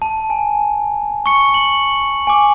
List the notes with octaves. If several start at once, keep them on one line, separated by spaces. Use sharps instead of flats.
A5
G#5
C#6 C#7
F#7
G#5 D6